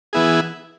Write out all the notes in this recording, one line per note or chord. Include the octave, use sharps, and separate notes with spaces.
E3 B3 E4 G#4